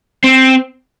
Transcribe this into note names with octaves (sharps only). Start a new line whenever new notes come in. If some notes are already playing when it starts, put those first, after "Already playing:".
C4